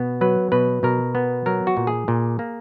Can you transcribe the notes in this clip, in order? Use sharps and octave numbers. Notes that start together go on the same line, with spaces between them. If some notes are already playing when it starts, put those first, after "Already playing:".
Already playing: B2 B3
F#3 B4
B2 B4
B2 A#4
B3
F#3 A#4
F#4
A#2
G#4
A#2
A#3